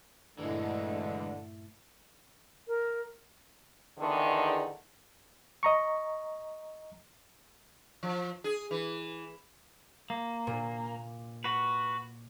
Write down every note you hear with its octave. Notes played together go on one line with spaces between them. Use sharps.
G2 A#2 D3 E3 G#3 A3 E4
A#4
E2 D3 D#3
D#5 A#5 C#6
F3
G#4
E3
A#3
A#2
F#4 B4